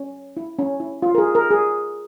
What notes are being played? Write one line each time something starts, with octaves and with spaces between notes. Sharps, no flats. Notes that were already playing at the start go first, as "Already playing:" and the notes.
Already playing: C#4
E4
C#4
E4
F4
A#4
G#4
A#4
G#4